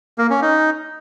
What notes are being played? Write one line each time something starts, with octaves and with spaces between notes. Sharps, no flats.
A#3
C#4
D#4